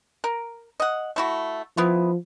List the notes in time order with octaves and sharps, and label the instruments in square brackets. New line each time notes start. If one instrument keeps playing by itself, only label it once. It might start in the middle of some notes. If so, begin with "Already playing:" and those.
[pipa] A#4
D#5 F#5
A3 E4 F#4
[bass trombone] F3 [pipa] B3 E4 F4